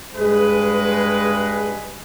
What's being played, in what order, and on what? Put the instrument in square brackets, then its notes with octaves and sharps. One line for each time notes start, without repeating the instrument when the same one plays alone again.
[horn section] G2 G#3 G#4 B4